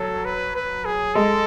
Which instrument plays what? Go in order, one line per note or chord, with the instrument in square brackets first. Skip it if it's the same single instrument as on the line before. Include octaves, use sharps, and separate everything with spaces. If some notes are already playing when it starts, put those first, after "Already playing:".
Already playing: [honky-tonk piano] F#3 [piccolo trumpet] A4
[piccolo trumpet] B4
B4
G#4
[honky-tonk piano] G#3 [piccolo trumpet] A4